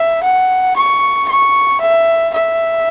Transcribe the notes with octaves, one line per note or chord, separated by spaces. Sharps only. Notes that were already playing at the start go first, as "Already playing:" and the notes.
Already playing: E5
F#5
C#6
C#6
E5
E5